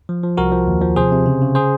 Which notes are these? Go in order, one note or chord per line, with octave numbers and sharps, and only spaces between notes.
F3
F3
C2 F#4 A#4
F3
D#2
F3
C3 G#4 C5
C3
C#3
C#3
G#4 C5